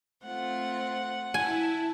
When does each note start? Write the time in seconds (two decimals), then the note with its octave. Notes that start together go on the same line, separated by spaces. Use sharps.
0.24 A3 C4 F4 F#5
1.34 E4 G#5 A5